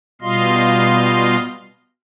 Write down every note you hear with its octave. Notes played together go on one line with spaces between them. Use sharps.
B2 G3 F4 D#5 F5 C6